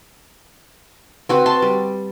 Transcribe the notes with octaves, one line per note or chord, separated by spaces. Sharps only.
C4 F#4 B4
A5 C6
G3